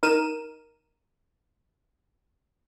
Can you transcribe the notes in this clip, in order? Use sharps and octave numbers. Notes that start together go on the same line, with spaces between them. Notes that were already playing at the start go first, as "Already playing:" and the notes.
D#4 A#4 D#7 E7